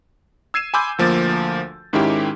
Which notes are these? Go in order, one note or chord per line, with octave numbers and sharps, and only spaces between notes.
E6 G#6 C7 D#7 E7
G#5 B5 C6 D6 E6 G6
D2 F3 A#3 D6 A6
G#2 D#3 G#3 C#4 E4 G4